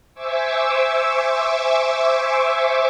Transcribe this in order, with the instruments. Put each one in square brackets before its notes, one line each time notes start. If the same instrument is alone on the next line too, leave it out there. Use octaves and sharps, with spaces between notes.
[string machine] C5 E5 G#5 C#6 D6 E6